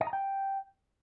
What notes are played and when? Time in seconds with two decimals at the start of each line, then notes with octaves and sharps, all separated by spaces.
0.01 D#5
0.07 A#5
0.13 G5